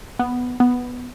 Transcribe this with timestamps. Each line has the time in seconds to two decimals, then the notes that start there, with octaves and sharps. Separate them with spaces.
0.19 B3
0.60 B3